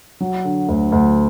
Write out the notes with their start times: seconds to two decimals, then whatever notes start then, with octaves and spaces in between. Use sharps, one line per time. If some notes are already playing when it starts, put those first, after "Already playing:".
0.20 F#3
0.45 D3
0.68 D2
0.92 D2